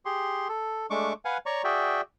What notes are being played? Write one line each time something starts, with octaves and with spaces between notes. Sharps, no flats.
G4 G#4 C6
A4
G#3 A3 D4 C#6 D6
B4 F5 F#5 G#5
C#5 D5 A#5 C#6
F#4 G#4 D5 E5 G5